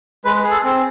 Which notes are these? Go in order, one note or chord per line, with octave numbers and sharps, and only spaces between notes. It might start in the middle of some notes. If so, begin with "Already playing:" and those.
G#3 B4
G#4
A4
C4